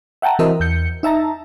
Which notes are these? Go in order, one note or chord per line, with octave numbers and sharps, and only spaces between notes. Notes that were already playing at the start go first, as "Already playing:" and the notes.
E5 F#5 G5 A5 A#5
E3 C4 F#4 A#4 D#5 E5
E2 G6 C#7
D#4 E5 A5 A#5